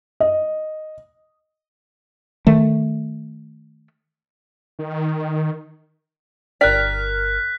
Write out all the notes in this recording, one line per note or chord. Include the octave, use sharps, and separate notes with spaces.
D#5
D#3 A3
D#3
G1 A#4 D5 G5 F6 F#6 B6